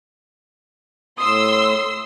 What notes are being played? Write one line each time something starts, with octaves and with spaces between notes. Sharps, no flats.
A2 C6 D#6 E6